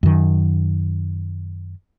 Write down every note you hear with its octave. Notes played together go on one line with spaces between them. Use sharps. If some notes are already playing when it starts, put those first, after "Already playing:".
F#2 D#3